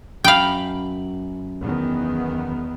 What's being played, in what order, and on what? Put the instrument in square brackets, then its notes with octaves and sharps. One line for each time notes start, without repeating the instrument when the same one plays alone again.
[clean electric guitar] F#2 B5 [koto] F5 G5
[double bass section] E2 D#3 B3